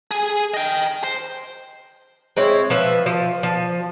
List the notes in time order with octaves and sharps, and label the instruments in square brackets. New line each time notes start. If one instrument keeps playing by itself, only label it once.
[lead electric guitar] G#4 G#5
D#5 G5
C5
[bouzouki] G#3 C4 E4 C#5
F3 B4 E5
F3
F3